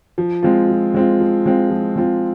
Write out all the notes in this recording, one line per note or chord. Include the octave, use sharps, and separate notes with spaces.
F3
G#3 C4 F4
F3
G#3 C4 F4
F3
G#3 C4 F4
F3
G#3 C4 F4